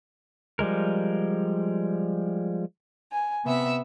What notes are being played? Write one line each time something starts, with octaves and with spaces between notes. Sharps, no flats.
F3 G3 G#3 A#4
G#5
C3 B3 E5 E6